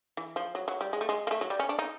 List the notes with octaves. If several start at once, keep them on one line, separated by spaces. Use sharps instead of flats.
E3
F3
F#3
F#3
G3
G#3
A3
G#3
A#3
A3
F#3
G3
C#4
D4
D#4